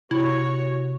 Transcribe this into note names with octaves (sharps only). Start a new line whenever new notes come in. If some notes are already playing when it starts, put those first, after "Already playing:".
C3 E4 F#4 C#5